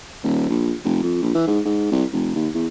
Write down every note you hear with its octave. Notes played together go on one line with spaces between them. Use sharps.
D#1
A#1
F1
F2
A#1
E3
G#2
G#2
C2
F1
D#2
E2